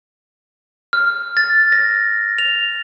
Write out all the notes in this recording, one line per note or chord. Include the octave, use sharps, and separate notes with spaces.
F6
A6
A#6
F7